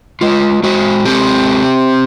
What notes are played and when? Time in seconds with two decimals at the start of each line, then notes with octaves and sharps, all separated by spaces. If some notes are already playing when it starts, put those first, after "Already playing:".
0.21 G#3 F4
0.63 G#3 F#4
1.05 C4 G4